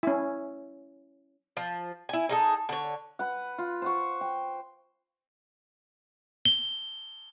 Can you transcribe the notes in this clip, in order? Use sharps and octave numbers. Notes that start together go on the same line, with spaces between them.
C#4 E4
F3
E4 G#5
D#4 G#4 A4
D3 C#5
B4 F#5
F4
C5 F#5 C#6
G5
G7